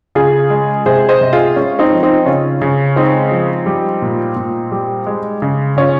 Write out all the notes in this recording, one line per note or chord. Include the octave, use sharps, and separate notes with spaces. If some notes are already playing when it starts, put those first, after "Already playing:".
C#3 F4 G#4
G#3
C3 G#4 C5
C5 D#5
C3
F4 G#4
G#3 C#4
C4 D#4
F3
C4 D#4
C#3 C#4 F4
C#3
G#3 C4 D#4
F3
G3
A#2
A#2
G3
G#3
C#3
C#3 C#4 F4